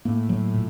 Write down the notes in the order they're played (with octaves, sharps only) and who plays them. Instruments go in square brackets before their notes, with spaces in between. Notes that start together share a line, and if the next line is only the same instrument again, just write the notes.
[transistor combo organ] A2 [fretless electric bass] A#3
[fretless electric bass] F#3
A#2